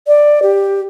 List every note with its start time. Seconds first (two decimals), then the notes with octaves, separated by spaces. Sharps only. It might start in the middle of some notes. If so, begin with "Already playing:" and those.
0.07 D5
0.42 G4